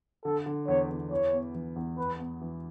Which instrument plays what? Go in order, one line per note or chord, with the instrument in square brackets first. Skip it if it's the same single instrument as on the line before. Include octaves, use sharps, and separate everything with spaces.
[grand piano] D3 [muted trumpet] A4
[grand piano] D3
[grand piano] E2 [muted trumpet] C#5
[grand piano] E2
[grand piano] E3 [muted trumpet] C#5
[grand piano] B3
E3
E2
[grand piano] B3 [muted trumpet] B4
[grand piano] B3
E3